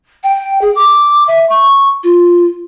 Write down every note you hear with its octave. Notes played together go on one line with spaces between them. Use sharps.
G5
G#4
D6
E5
C#6
F4